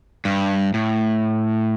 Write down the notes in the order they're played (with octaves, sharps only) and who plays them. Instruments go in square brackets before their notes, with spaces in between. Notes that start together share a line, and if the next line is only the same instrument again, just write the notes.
[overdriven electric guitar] G2
A2